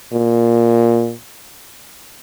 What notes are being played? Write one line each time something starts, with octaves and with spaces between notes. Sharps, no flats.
A#2